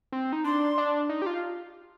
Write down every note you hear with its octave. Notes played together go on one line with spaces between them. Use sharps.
C4
D#4
D4 C6
D4
D#4
G4
F4